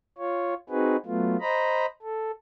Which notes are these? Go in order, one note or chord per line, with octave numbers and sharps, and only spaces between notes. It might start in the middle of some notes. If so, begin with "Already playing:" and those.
F4 C#5
C4 D#4 F#4 G#4 B4
F#3 A3 B3 F4
C5 D#5 A#5 B5
A4